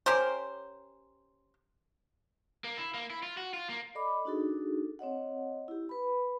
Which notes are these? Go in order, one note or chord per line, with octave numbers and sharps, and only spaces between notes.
C#4 G4 A#4 C5
A#3
E4
A#3
E4
F4
F#4
F4
A#3
A4 D5 D#5 B5 D6
D4 D#4 F#4 G#4 A4
C4 C#5 D#5 F#5
E4 G4
B4 B5